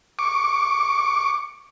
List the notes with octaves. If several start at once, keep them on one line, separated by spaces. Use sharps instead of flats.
C#6 D6